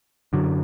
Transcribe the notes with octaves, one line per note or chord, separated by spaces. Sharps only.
F#2 D3 F#3